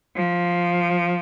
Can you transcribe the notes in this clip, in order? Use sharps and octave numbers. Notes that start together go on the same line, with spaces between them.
F3